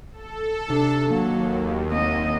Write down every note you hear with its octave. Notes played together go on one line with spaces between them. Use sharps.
A4
C3 D4
D#2 F#3 A#3
A#3 C4 D#5